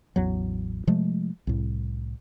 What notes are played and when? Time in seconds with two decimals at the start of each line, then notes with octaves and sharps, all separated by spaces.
0.16 A1 E2 F#3
0.87 C3 F3 G#3 A3
1.47 C2 A2